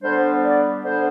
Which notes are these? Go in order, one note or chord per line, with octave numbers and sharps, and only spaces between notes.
D3 G3 B3 D4 C5
D5
D3 G3 B3 D4 C5